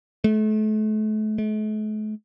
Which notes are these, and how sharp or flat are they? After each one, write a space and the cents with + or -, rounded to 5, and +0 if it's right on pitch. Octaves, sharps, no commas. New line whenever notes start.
A3 -35
A3 -45